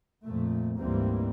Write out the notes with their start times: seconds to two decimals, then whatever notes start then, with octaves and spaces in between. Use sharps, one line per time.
0.24 F2 A#2 A3
0.79 D2 G#2 E3 G3 A#3 C4